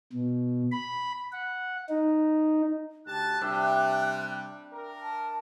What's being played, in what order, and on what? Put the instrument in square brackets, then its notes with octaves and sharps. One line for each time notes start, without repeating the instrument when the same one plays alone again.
[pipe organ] B2
B5
F#5
D#4
[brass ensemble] D2 G4 A5 [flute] F#6
[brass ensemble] C3 G3 [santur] D4 E5 G5
[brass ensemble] A#4
[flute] A5